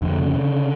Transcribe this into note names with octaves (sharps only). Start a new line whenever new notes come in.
F2 D3
C#3
C#3